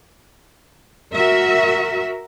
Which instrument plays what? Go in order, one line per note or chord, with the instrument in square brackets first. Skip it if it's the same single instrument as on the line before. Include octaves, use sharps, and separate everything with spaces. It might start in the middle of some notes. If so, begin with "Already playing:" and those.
[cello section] F#4 A#4 E5